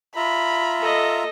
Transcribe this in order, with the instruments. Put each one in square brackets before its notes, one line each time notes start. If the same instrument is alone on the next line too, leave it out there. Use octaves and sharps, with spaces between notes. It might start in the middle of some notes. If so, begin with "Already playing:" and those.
[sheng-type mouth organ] F4 E5 A#5 [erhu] B5
[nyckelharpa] A4 D#5